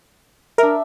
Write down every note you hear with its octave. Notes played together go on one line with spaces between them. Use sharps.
D4 A#4 E5